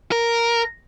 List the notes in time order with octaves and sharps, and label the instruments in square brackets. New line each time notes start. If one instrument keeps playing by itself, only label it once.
[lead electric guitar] A#4